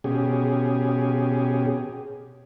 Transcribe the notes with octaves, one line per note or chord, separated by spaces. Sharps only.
B2 C#4 G4 G#4